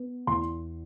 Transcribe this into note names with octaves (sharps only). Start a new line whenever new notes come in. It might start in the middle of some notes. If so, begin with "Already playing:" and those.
Already playing: B3
E2 C6